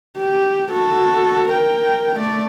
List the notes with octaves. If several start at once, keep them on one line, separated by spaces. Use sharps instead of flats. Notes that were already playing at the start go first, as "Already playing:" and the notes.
G4
F#4 A4
A#4 G5
A3 D5